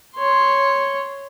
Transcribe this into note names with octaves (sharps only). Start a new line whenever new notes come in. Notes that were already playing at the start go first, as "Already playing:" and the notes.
C#5 C6